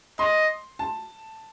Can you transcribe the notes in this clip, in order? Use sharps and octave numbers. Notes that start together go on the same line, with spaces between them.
D#5 C6
A5